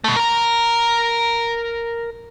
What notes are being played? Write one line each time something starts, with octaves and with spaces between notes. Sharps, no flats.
B2 A3
A#4 A#5